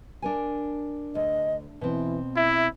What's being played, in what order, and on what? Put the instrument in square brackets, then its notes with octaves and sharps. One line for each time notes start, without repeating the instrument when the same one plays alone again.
[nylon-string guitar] D4 A#4 G#5
[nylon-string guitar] D2 [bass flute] D#5
[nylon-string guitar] B2 C4 [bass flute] E3
[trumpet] E4 [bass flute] E5